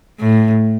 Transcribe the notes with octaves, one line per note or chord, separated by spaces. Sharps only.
A2